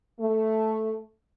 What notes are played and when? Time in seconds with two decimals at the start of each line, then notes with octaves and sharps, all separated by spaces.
0.19 A3